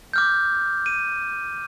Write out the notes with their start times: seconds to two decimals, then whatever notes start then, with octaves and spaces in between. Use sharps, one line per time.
0.13 D6 F6 G6
0.86 D#7